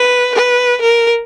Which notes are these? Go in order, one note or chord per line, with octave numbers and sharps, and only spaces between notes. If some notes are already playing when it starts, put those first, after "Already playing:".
Already playing: B4
B4
A#4